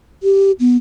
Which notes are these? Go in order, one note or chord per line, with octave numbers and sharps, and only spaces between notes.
G4
B3